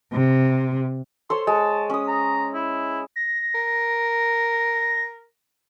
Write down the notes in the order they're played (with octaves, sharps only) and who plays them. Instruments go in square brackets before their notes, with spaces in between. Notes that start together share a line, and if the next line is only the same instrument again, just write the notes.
[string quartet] C3
[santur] A4 C5 C#5 [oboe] C6
[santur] G#3 [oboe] A5
[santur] C#4 D#6
[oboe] A#5
E4
[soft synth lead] A#6
[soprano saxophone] A#4